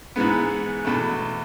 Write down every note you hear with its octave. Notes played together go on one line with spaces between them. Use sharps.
G#2 E3 G#3 B3
E2 B2 A3